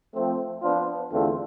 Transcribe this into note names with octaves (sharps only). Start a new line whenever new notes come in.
F3 A3 C4
F3 B3 D4 F4 C5
E2 D3 A3 C4 F4